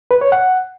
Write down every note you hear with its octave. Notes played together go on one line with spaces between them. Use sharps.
B4
C#5
F#5